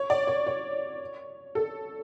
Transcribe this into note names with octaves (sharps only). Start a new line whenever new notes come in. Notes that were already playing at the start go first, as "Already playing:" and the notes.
Already playing: C#5
D5
C#5
C#5
A4